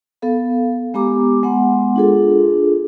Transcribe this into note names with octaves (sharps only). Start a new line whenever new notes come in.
B3 A4 F5
G#3 B3 G4 A#5 D6
G#3 B3 F#5 C6
D4 F4 G#4 A4